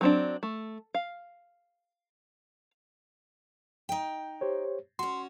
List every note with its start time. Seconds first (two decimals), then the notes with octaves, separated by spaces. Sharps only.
0.01 F#3 C4 D4
0.43 A3
0.94 F5
3.89 D#4 G5
4.41 G4 C5 C#5
4.99 C#4 F#4 C6